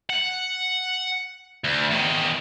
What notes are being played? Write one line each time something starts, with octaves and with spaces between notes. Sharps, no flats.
F#5
D2
E2 D#3